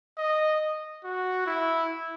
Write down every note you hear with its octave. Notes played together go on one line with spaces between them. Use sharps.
D#5
F#4
E4